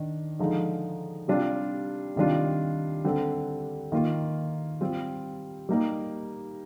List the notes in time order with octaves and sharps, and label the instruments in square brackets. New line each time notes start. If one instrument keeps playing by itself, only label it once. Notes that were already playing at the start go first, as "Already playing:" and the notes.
Already playing: [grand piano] D#3 D4
D3 F3 G#3 D#4
C3 G3 D4 F4
C3 D#3 G3 D4 F4
D3 G3 C4
D#3 A#3 F4
G3 C4 F4
G3 A#3 D#4